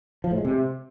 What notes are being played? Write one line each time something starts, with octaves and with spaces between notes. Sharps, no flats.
F3
A2
G#3
C3